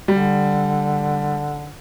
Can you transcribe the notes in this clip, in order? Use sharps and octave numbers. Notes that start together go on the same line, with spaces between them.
D3 G3